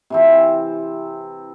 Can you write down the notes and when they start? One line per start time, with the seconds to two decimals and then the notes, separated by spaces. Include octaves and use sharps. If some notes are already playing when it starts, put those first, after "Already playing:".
0.10 C3 E3 C4